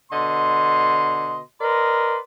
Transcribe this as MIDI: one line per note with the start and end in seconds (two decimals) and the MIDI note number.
0.11 1.40 47
0.11 1.40 50
0.11 1.40 75
0.11 1.40 84
1.61 2.18 70
1.61 2.18 71
1.61 2.18 74
1.61 2.18 75
1.61 2.18 84